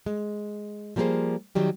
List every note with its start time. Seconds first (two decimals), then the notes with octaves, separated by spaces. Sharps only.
0.06 G#3
0.96 F3 G3 A#3 B3 G#4 C5
1.55 D#3 F#3 G3 G4